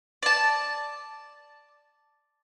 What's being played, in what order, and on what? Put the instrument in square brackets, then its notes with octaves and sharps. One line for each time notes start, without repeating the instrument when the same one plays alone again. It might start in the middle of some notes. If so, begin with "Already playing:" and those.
[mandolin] D5 A5